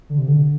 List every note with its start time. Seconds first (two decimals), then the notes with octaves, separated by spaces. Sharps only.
0.09 D3
0.18 C3
0.28 D3